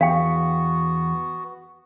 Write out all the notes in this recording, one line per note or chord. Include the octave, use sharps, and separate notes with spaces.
E2 B3 F#4 F5 G5